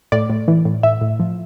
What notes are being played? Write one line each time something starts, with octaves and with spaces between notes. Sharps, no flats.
A2 D5
A2
E3
A2
A2 E5
A2
F3